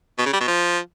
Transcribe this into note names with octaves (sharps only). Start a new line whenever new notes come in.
B2
C#3
G3
B2
F3